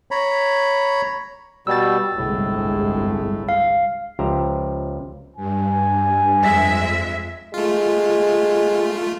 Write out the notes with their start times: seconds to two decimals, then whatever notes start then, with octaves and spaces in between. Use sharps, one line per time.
0.11 C#5 A#5 B5
1.67 B2 G3 E6 A6
2.16 G1 C2 A2 G#3
3.49 F5
4.19 C#2 F3 G4 C5 E5 A#5
5.36 G2 G#5
6.40 F2 G#3 E5
7.54 G#3 A3 F4